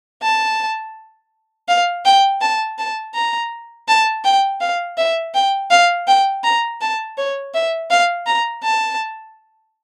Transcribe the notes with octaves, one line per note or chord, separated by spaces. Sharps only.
A5
F5
G5
A5
A5
A#5
A5
G5
F5
E5
G5
F5
G5
A#5
A5
C#5
E5
F5
A#5
A5